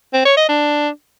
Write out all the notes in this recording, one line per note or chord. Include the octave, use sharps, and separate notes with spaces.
C4
C#5
D#5
D4